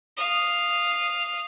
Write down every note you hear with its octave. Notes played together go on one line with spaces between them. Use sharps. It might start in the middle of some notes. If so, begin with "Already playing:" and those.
F5 D#6